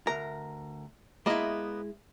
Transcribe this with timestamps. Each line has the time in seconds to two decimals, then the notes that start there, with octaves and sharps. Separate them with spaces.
0.07 D2 A#4 A#5
1.26 G#3 A#3 B3 E4 D#5